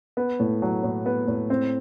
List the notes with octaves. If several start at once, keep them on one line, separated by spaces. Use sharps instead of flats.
B3
A2
F#3
A2
B3
A2
C4